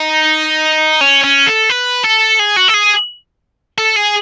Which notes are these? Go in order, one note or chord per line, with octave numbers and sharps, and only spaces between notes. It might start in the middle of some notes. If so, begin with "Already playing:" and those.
Already playing: D#4
C#4
C#4
A4
B4
A4
G#4
F#4
A4
G#4
A4
G#4